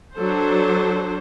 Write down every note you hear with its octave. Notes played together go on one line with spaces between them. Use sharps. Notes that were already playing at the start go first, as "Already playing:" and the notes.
F#3 D4 A4 C5